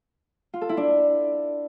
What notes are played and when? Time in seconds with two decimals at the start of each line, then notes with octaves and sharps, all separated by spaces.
0.54 F4
0.61 A4
0.69 E4
0.77 D4